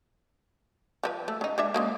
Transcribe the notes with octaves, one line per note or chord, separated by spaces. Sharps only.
F3 E4 B4
A3
C#3 D#4
G#3 D4 E5
C#3 G#3 A#3